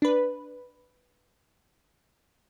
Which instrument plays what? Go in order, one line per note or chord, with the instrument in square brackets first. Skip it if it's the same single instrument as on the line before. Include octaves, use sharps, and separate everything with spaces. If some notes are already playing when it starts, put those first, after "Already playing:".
[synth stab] D4 B4